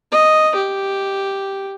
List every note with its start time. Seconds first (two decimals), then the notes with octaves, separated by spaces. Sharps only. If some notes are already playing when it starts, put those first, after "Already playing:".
0.12 D#5
0.55 G4